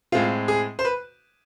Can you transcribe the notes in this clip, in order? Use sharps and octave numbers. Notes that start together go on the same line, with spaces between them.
A2 G#3 C4 F4
G#4
C5
B4